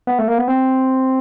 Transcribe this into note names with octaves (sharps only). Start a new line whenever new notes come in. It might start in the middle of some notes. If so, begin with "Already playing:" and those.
B3
A3
A#3
B3
C4